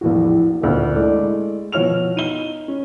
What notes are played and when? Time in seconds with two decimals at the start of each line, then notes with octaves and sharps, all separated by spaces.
0.01 A#1 E2 A2 E4 F#4
0.61 A1 D2 A#2
0.95 G#3 A3 E4 A4 D5
1.72 B2 F3 F#4 C#5 F6 F7
2.16 D#4 D#7 G7
2.68 C#4